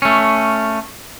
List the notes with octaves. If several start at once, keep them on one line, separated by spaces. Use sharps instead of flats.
A3 C#4